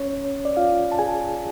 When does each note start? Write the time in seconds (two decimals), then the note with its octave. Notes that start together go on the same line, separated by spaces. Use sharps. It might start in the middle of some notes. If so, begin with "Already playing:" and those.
Already playing: C#4 C#5
0.45 D5
0.57 F4 F5
0.92 A5
0.99 G#4 G#5